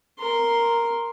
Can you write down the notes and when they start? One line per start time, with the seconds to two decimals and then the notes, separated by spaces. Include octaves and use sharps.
0.19 A#4 C6